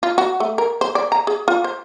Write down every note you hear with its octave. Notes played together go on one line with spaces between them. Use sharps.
F4
F#4
A3
A#4
C5
D5
A#5
G#4
F4
C5